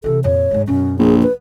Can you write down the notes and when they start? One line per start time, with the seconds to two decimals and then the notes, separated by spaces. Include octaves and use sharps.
0.04 C3 E3 A4
0.24 F2 A#2 C#5
0.51 G#2 G#3
0.67 F#2 B2 C#4
0.99 A#1 G#4
1.22 B4